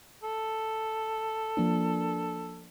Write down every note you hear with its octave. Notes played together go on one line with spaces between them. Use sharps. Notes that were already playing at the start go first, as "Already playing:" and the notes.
A4
F3 A#3 D4